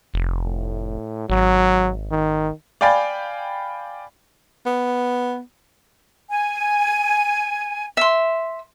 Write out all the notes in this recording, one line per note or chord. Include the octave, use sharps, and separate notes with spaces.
F1
A2
G#1 F#3
D#3
D5 F5 G5 G#5 B5 A6
B3
G#5
E5 C6